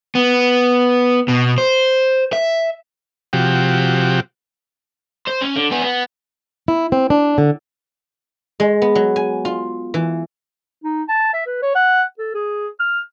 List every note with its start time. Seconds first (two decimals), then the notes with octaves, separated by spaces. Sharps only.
0.15 B3
1.28 B2
1.58 C5
2.33 E5
3.33 C3 F3 F#4 G4
5.28 C5
5.41 C#4
5.56 D3
5.72 B3 G#4
5.84 B3
6.68 E4
6.92 C4
7.10 D4
7.38 D3
8.60 G#3
8.82 B3
8.95 F#3
9.16 G#5
9.45 F4
9.94 E3
10.84 D#4
11.08 A5
11.33 E5
11.46 B4
11.62 C#5
11.75 F#5
12.18 A4
12.34 G#4
12.80 F6